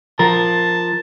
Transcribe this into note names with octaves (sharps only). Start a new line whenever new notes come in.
F3 A#4 A5